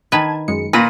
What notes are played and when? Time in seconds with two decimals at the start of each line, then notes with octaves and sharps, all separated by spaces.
0.12 D#3 B4 A5 G#6
0.48 F#2 G#3 C#7
0.73 A#2 B4 A#6 D#7